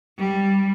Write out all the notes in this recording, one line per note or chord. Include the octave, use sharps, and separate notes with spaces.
G3